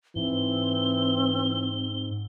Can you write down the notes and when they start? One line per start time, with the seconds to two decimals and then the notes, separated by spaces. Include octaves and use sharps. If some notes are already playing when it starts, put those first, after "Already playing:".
0.16 G#2 E3 C4 G7